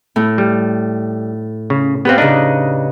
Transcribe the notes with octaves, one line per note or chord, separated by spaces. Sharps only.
A2
G3
C#3
B3 C4 G4 B4 F5
C#3 D4 D#4 D#5